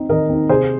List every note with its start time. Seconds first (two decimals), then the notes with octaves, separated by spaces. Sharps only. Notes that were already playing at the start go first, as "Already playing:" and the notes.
Already playing: C4 D#4
0.09 D#3 A#4 D#5
0.30 C4 D#4
0.49 C3 G#4 C5